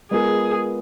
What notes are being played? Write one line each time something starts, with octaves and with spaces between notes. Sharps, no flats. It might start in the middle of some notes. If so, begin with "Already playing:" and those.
G#3 B3 F4 G#4 A#4